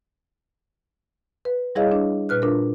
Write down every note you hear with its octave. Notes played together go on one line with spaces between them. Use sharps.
B4
G3 E4 G#4 C#5 D#5 F5
D4
A#2 B4 F6 F#6
D4 F4 A#4